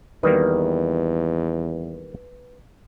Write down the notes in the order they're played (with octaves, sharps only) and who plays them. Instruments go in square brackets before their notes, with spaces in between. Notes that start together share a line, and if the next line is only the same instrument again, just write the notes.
[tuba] E2 [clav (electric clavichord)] D#3 G3 A#3 [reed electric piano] B4